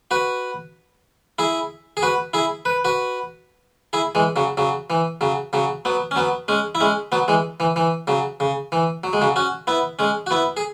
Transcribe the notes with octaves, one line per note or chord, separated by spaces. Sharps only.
F#4 B4
E4 G#4
G#4
F#4 B4
E4 G#4
B4
F#4 B4
E4 G#4
E3 G#3
C#3 F#3
C#3 F#3
E3
C#3 F#3
C#3 F#3
F#3 B3
C#4
F#3 B3
G#3 C#4
E4
G#3 C#4
F#3 B3
E3 G#3
E3
E3
C#3 F#3
C#3
E3
F#3
G#3
C#3 F#3
C#4 F#4
B3 E4
G#3 C#4
F#4
B3 E4
G#4